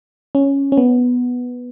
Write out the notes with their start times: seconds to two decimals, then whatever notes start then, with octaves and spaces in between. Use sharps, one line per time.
0.35 C#4
0.72 C#4
0.78 B3